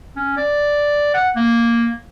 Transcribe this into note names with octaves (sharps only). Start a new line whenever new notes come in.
C#4
D5
F#5
A#3